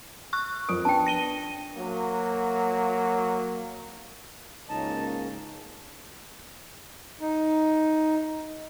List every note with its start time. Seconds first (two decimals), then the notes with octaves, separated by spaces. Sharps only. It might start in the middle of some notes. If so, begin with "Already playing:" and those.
0.33 C#6 F#6
0.69 F2 A#4 D#6 D7
0.85 B3 D4 G5 A5
1.06 A#6 D#7 G7
1.76 F#3 A#3
4.69 C#2 G#2 A#3 C#4 D#4 A5
7.21 D#4